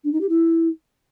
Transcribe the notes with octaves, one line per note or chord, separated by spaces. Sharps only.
D4
D#4
G4
E4